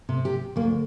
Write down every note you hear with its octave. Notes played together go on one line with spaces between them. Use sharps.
C3
G4
D2 A#3